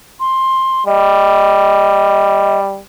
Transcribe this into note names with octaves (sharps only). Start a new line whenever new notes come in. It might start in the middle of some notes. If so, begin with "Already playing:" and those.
C6
G3 D#5